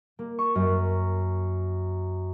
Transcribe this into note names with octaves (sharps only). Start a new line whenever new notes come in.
A#3
C#6
F#2